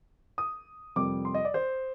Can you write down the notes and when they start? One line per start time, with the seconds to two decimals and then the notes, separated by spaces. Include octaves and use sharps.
0.38 D#6
0.96 F2 C3 G3 A#3 D6
1.25 C6
1.34 D#5
1.45 D5
1.54 C5